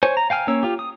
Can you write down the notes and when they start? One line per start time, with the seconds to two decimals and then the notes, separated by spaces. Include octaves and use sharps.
0.03 C5 C#5 G#5
0.17 A#5
0.30 F5 G5 G#5 F6
0.47 A#3 C#4 C#5 E6
0.63 F4 G4
0.79 D#6